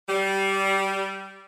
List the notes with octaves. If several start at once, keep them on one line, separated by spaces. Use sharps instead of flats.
G3